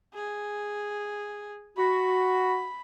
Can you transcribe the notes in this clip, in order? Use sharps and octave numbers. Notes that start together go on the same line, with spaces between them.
G#4
F#4 B5